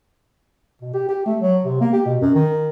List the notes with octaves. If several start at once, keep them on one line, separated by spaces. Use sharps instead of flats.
B2
G4
G4
A3
F#3
C3
A#3
G4
B2
F#2
D#3